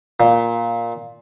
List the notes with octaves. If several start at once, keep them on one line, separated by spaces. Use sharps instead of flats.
A#2